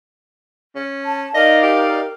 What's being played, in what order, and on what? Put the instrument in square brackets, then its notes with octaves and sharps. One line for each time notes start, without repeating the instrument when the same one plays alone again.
[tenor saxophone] C#4
[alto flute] A5
[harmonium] D#4 D5 F5 [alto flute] A#4 [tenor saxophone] D#5
[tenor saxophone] G4